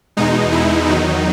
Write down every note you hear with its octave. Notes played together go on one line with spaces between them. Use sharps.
E2 B2 G#3 D#4
E4
E2 D#3 F#3 D#4